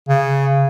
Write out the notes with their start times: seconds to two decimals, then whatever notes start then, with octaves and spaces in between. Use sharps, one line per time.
0.08 C#3